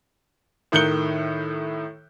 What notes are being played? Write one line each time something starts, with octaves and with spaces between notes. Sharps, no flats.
A2 D#3 F#6 G6 C#7 G7